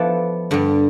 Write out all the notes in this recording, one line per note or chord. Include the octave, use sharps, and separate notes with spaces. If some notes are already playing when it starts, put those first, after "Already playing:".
Already playing: F3 B3 E4 A4 D5
G2 D3 G3